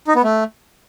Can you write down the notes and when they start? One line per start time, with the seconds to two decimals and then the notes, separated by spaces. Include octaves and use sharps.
0.08 D#4
0.16 B3
0.24 A3